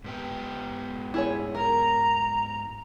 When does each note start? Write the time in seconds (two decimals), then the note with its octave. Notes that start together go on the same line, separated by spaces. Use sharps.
0.04 G#2 B3 G4
1.14 E4 G#4 C#5
1.55 A#4 A#5